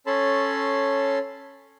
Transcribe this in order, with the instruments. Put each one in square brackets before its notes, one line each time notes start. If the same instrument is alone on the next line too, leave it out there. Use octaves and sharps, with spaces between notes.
[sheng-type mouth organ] C#4 A4 C#5 A5 B5 C6